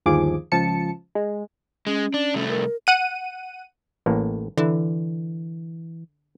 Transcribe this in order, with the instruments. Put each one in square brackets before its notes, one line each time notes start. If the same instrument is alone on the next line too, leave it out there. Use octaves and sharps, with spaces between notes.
[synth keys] G1 D#2 F3 G#4 D6
C#2 F3 A5 C#7
G#3
[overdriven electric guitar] G#3 [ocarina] C#4
[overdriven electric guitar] D4
C2 A3
[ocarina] A#4
[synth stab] F#5 D#7
[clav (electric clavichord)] A1 A2 A#3
[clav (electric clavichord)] D3 [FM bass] E3